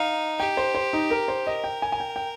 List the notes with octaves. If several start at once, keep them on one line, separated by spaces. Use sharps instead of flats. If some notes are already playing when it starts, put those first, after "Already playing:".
Already playing: D#4 F5
G4 G5
C5
C5
D#4
A#4
C5
A#4 D#5
G5
G#5
G#5
G5
G5